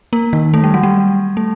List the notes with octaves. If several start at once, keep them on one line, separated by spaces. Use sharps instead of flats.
A#3
D#3
A3
G3
F#3
G3
A3